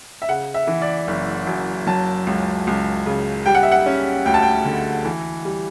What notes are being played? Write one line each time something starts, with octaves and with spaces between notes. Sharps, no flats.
E5
C#3 F#5
E5
E3
D5
F#1
F#2
F#3 A5
C#2
C#2
C#3
G3 G5
F#5
E5
F#5
C#4
D2 G5
A5
G5
D3
E3
G3